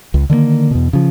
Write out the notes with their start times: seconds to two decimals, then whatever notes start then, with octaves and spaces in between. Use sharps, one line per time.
0.14 C#2
0.30 D3 D#3 G#3 A#3
0.71 E2 B2
0.93 C#3 F3